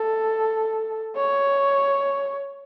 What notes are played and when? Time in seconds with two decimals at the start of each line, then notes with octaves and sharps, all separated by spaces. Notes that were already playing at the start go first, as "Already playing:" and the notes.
Already playing: A4
1.16 C#5